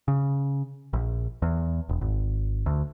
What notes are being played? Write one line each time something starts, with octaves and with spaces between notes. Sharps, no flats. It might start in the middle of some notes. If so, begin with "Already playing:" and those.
C#3
A#1
E2
E1
G#1
D2